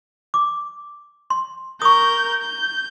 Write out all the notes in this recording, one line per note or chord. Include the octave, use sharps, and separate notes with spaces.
D6
C6
A#4 C#6 D#6 G6
G6